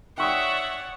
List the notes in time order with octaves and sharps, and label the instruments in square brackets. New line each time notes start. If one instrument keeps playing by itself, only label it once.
[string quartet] C#5 D5 F#5 [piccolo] E5 [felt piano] G5 C#6 D#6